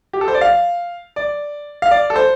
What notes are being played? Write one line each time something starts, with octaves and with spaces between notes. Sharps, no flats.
G4
A4
C5
D5
F5
D5
F5
D5
A4
C5